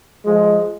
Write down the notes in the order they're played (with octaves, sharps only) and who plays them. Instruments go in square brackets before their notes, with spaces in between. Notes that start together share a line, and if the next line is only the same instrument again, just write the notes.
[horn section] F3 G#3